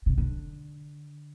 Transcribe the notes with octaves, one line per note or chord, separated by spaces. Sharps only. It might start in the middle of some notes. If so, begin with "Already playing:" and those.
C3
D3